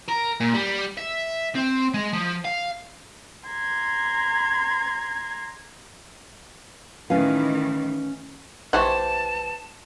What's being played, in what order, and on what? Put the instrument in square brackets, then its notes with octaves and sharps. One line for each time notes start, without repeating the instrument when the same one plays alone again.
[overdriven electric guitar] A#4
A#2
G3
E5
C4
G#3
F3
F5
[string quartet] A#5 C6 G#6
[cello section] A2 D#3 E3 [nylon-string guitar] C#4 B4 F5
[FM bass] A#1 [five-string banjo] E3 G4 C5 [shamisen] A3 C#5 F#5 [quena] A5